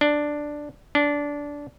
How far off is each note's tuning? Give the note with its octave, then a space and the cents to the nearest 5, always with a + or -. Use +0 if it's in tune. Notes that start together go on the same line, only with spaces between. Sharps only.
D4 +5
D4 -15